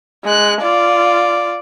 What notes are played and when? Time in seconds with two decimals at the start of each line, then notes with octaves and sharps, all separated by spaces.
0.24 G#3 F#6
0.62 F4 D5